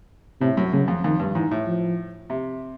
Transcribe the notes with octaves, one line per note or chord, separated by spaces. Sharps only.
A2 C3
F#2
F#2 C#3
F2
F2 D#3
G2
G#2 E3
A2
F3
C3